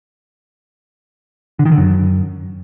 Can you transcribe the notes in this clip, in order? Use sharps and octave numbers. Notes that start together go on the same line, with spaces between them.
D3
D#3
D3
F#2